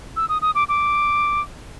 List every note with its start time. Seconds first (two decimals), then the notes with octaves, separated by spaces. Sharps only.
0.17 E6
0.29 D#6
0.42 D#6
0.55 D6
0.69 D6